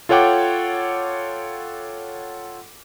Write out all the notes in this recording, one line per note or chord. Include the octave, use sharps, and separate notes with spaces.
F4 A4 C#5 F#5 G5 D6